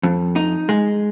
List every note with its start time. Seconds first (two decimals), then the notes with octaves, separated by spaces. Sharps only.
0.03 F2
0.36 D#4
0.69 G#3